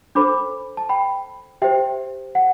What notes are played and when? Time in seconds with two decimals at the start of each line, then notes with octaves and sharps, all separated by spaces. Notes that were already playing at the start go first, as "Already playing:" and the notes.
0.15 D4 A4 C5 B5 D6
0.77 A5
0.89 G5 B5
1.62 G4 C5 E5 G5
2.35 F#5